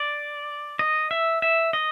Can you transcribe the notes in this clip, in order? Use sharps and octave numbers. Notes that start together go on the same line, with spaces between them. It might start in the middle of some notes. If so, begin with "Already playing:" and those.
Already playing: D5
D#5
E5
E5
D#5